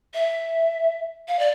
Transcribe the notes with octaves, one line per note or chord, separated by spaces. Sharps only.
E5
F5
D5